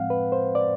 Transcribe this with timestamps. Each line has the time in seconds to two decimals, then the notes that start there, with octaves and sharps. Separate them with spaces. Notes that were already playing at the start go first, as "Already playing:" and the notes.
Already playing: A2 F3 G#3 C4 F5 F#5
0.10 B4
0.32 C5
0.55 D5